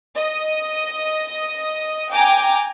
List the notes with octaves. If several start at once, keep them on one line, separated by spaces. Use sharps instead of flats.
D#5
G5 G#5 A#5 D6